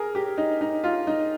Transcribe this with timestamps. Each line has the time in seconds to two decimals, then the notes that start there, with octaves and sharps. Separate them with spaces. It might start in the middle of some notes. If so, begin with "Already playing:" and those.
Already playing: G#4 A#4
0.15 G4
0.38 D#4
0.61 D#4
0.84 F4
1.07 D#4